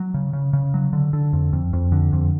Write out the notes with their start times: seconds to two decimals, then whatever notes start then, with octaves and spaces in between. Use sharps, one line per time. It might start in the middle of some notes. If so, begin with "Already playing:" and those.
Already playing: F#3
0.14 C#3
0.33 C#3
0.53 C#3
0.74 F#3
0.93 D3
1.13 D3
1.33 F2
1.53 F2
1.73 F2
1.92 D3
2.13 F2